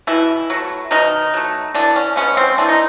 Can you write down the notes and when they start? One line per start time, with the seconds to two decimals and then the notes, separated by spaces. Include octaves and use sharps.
0.07 B2 E3 E4
0.50 F#3 A3
0.91 B2 D#3 D#4
1.34 F#3 A3
1.74 D3 E3 D4
1.96 C#4
2.16 G#3 B3 C#4
2.37 C4
2.58 E3 D4
2.69 D#4